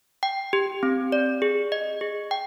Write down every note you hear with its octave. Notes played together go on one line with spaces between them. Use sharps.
G5
G4
C4
D5
G#4
D#5
G#4
G5